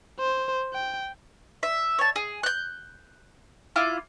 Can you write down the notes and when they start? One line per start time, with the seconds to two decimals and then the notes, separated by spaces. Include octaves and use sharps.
0.19 C5
0.73 G5
1.63 E5
1.99 C#5 A5
2.16 G#4
2.43 F#6 G6
3.76 E4 F4 F5 D6